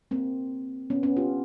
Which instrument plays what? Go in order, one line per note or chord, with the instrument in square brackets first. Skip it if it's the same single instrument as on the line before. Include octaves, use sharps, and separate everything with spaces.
[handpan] A#3 C4
B3 C#4
B3 C#4
F4 G4